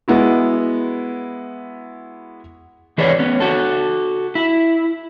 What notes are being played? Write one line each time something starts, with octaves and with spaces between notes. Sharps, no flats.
G#3 B3 E4 F#4
E3 G#4 B4 C#5 D5
B3 C#4
F#4 A4
E4